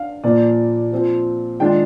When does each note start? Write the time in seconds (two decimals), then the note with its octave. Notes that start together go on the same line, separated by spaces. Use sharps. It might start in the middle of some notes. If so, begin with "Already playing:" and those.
Already playing: D4 F5
0.24 A#2 F3 A#3 D5
0.92 F3 C4 F4
1.60 D#3 G#3 D4 F4 G5